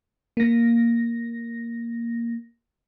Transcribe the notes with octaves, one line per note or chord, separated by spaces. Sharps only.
A#3 A#6